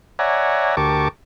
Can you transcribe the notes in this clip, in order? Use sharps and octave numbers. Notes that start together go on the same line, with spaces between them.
C#5 D5 E5 F#5 G#5 A#5
D2 G4 A#4 A5 C#6 D6